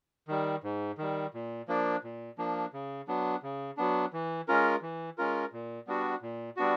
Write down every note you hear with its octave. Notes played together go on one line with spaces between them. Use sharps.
D#3 G3
G#2
D#3 G3
A#2
F3 A#3 D4
A#2
F3 A#3 D4
C#3
F#3 B3 D4
C#3
F#3 B3 D4
E3
G#3 C#4 F4 A#4
E3
G#3 C#4 F4 A#4
A#2
G3 B3 D4 F#4
A#2
G3 B3 D4 F#4